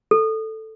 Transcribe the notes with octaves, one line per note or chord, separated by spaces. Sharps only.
A4